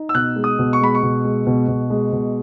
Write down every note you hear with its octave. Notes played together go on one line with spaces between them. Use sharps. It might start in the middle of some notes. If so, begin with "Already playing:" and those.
Already playing: D#4
E6
B2 F#6
G#3
D#6
B2
C#6
G#3 B5
C#6
B2
G#3
B2
B2
G#3
B2